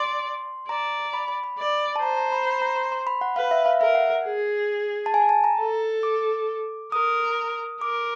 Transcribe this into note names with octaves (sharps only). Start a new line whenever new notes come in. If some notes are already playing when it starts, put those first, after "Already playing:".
Already playing: D5 C6
D5 A#5
B5
B5
B5
D5
A5
C5 A#5
A#5
B5
B5
A#5
C6
C6
B5
F#5
B4 F5
E5
F5
A#4 E5
F#5
G#4
A5
G#5
A5
A#5
A4
D6
A#4 D#6
A#4 D6